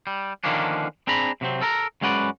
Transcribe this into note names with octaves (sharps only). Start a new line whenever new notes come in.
G3
D3 D#3 F3 A#3 C#4 D4
C4 D4 G#4 A#5 B5
C3 F#3 C4
A4 A#4 A#5
F#2 G#3 C#4 F#4 B4 D5